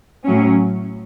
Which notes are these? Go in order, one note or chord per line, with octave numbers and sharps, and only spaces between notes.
A2 F#3 C#4